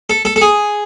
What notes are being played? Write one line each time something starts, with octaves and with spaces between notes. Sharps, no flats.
A4
A4
A4
G#4